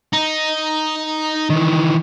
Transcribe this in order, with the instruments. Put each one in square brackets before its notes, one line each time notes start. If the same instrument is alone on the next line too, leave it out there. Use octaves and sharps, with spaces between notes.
[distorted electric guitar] D#4
[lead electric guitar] D#3 E3